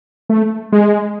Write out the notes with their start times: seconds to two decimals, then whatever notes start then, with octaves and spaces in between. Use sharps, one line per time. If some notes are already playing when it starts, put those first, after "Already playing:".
0.29 A3
0.72 G#3